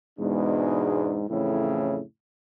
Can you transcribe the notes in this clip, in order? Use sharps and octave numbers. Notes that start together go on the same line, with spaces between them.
E2 G#2 B2 G#3 D4
F2 A2 C#3 E3 E4